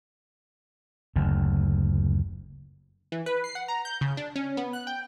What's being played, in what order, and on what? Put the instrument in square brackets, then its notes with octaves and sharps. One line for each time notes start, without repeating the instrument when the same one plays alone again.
[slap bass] F#1 D2
[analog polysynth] E3
B4
C7
F#5
A#5
G6
C#3
D4
C#4
B3
F#6
G5